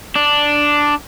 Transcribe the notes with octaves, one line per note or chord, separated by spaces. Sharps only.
D4